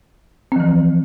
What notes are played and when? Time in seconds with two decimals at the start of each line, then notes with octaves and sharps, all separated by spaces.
0.52 C4
0.56 F3
0.60 E3